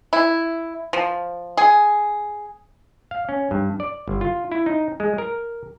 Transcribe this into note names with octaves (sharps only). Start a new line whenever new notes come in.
E4
F3
G#4
F5
C#4
G2
D5
G1
F4
E4
D#4
G#3
A#4